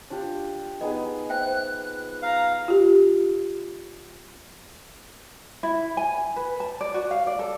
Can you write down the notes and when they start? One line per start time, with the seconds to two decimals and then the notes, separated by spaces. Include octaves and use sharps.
0.10 D4 F4 G4
0.81 B3 D#4 G#4 D#5
1.30 C5 E5 G5 F#6
1.78 F#6
2.22 F5 A#5
2.68 F4 G4
5.63 E4
5.97 G#5
6.36 B4
6.60 A5
6.81 D5
6.94 F#4
7.11 F5
7.27 D5
7.39 A4